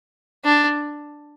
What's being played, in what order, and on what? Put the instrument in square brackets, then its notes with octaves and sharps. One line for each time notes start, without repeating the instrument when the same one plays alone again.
[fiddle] D4